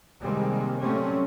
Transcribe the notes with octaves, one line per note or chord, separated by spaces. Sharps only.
C3 D#3 G3 G#3 A#3 C4
F#3 G3 A3 C4 C#4